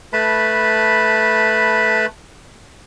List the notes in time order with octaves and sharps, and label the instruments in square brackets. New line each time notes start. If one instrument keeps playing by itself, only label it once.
[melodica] A3 B4 A5 B5